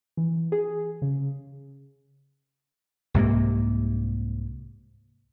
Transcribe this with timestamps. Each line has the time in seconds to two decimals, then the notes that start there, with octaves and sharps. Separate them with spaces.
0.17 E3
0.52 G#4
1.02 C#3
3.14 C2 G#2 C3 A#3